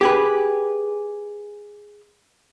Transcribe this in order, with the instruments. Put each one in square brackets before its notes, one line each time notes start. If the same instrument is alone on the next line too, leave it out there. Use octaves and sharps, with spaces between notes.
[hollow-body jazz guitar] G4 G#4 B4